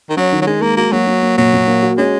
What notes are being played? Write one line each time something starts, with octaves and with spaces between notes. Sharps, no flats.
D#3
F#3 C#4
D#3
F#3
D#3 G#3
G#3 A#3
A#3 F#4
F#3 A#3
A#3
A#3
A#2 F#3
A#2
A#3
F#4
G#3 C#4